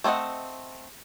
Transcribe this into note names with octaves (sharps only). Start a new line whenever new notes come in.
A3 C4 A4 D#5 F#5